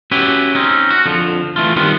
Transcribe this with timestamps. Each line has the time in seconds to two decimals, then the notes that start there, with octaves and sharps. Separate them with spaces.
0.11 C#4 E4 F#4 G4 B4
0.55 C4 C#4 D#4
0.91 F#4
1.06 F2 D3 F3
1.56 E3 A3 F4
1.76 D#3 G3 B3 C4 F4